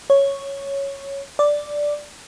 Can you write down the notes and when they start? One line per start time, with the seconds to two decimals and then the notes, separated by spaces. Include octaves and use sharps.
0.10 C#5
1.39 D5